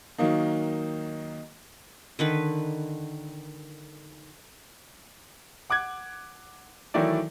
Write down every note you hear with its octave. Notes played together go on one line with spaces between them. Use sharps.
D#3 F#3 A#3 D#4
D3 D#3 B4
F#5 D6 F#6 G#6
D#3 E3 F#3 A3 E4 D5